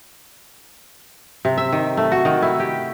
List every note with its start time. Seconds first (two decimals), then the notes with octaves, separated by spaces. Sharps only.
1.45 C3
1.58 E5
1.72 D#3
1.97 A3
2.12 F#4
2.25 D#3
2.42 E4
2.60 G4